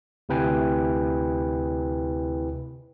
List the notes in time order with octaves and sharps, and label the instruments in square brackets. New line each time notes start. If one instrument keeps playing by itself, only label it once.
[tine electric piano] D2 C3 E4 B4 G5 G#5